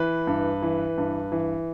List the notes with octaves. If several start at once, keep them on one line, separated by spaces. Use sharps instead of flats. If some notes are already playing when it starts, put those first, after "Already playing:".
Already playing: E3 B4
G2
E3
G2
E3